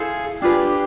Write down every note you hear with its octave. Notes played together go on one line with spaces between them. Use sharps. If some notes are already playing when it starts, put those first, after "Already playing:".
Already playing: E4 G#4 A4 C5 F5
D4 F4 G4 G#4 B4